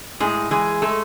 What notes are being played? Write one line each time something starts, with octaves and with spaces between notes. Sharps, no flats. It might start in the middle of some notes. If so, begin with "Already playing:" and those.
A2 G#3 G#4
E3 G#3 G#4
G#3 A3 A4